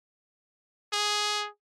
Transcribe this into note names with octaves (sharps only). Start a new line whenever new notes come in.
G#4